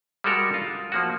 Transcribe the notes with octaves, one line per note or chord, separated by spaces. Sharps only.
G3 G#3 F#4 A4 A#4
F4
F3 A#3 F#4